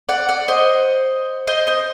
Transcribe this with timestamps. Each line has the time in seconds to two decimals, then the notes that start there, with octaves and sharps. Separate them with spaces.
0.09 D5 F#5
0.29 D5 F#5
0.48 C5 D#5
1.47 C5 D#5
1.67 C5 D#5